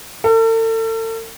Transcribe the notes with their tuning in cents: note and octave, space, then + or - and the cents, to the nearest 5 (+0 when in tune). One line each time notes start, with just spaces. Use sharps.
A4 +40